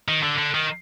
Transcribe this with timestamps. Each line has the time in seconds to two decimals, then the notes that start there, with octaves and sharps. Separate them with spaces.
0.08 D#3
0.23 D3
0.38 D3
0.54 D#3